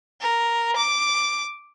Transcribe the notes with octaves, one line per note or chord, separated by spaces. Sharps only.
A#4
D6